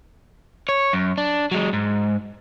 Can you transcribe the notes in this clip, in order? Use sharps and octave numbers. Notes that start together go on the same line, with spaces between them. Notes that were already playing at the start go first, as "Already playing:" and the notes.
C#5
F#2
D4
F#3 G#3
G#2